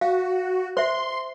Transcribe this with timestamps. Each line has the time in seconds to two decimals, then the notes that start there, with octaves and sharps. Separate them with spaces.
0.01 F#4 F5
0.77 C5 E5 C6